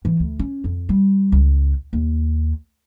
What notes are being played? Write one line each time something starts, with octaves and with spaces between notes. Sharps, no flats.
E3
D2
C#4
F2
G3
C#2
D#2